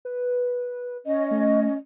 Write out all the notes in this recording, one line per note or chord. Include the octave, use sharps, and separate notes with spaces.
B4
C#4 D#5
A3